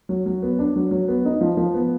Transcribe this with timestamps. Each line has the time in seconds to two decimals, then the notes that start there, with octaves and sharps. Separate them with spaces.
0.09 F#3
0.26 F#3
0.42 B3
0.59 D4
0.76 F#3
0.91 F#3
1.08 B3
1.25 D#4
1.41 F3
1.57 F3
1.75 B3